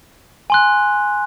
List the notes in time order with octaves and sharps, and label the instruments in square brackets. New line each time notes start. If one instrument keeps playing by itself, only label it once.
[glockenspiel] G#5 C6 F#6